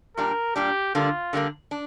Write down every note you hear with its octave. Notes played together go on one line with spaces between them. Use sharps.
A#2 G3 D4 A#4
A#2 G3 D4 G4
D3 G3 A#3 D4 F4
D3 G3 A#3 D4
D4